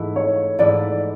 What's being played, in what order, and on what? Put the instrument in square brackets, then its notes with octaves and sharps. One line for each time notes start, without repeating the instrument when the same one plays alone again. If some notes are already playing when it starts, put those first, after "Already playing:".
Already playing: [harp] G#2 E3 A3 E4
[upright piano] C#5
[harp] G#2 E3 A3 E4 [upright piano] D5